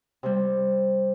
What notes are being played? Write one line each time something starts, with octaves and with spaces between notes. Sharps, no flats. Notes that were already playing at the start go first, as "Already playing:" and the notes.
C3 G3